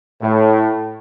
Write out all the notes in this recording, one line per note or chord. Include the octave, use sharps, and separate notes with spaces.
A2